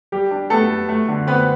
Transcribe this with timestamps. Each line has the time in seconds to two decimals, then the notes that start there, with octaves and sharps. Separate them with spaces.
0.12 G3 G4
0.31 D4
0.50 A3 B3 A4
0.70 B3
0.89 A3
1.08 D3
1.27 B3 C4 B4